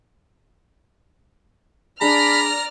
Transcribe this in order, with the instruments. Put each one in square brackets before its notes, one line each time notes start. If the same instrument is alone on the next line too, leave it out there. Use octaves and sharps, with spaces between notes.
[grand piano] D4 G#4 [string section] D5 F6 [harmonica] A#5 [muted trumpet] B5